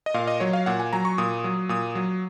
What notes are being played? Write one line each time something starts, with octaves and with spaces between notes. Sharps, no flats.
D#5
A#2 F5
D#5
F#3 C#5
F5
A#2 F#5
G#5
F#3 A#5
C#6
A#2 D#6
F#3
A#2 D#6
F#3